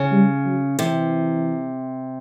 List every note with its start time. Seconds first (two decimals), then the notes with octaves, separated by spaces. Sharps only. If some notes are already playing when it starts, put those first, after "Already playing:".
Already playing: C#3
0.12 G3
0.46 F#3
0.79 C3 E3